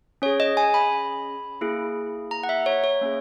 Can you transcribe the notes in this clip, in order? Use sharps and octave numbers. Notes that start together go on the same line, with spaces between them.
C#4 G#4 C#5
D#5
G#5
B5
A#3 E4 G#4
A#5
F#5
E5
C#5
C#5
A#3 C#4 G#4